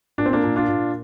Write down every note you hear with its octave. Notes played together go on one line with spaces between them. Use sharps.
A#2 D4
C4
A#3 D4
A#2
D4 F4
A#2